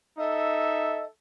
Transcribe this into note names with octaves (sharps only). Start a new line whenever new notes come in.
D#4 A4 D#5 E5